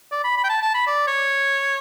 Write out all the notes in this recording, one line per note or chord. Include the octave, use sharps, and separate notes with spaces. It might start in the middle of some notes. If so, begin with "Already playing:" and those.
D5
B5
B5
G5
A5
A5
B5
D5
C#5